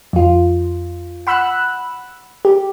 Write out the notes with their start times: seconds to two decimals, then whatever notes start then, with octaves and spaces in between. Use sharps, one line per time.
0.13 F2 F4
1.27 F#5 B5 E6 F#6
2.45 G4